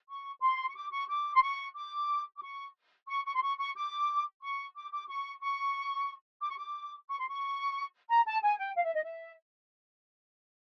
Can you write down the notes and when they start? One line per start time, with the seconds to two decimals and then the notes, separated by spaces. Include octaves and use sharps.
0.09 C#6
0.42 C6
0.69 C#6
0.75 D6
0.92 C#6
1.09 D6
1.35 C6
1.42 C#6
1.75 D6
2.37 D6
2.42 C#6
3.09 C#6
3.26 C#6
3.35 C6
3.42 C#6
3.59 C#6
3.75 D6
4.42 C#6
4.76 D6
4.92 D6
5.08 C#6
5.42 C#6
6.42 D6
6.50 C#6
6.58 D6
7.09 C#6
7.19 C6
7.28 C#6
8.09 A#5
8.26 A5
8.43 G#5
8.59 G5
8.76 F5
8.85 E5
8.95 D#5
9.04 E5